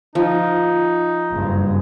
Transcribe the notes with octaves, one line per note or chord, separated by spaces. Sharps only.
F3 D#4
F#1 G2